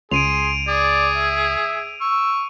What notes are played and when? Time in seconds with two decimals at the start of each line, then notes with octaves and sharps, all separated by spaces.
0.12 C#2 G#4 C6 D7 D#7 F7
0.68 G#4 D5
1.17 E5
2.01 C#6 E6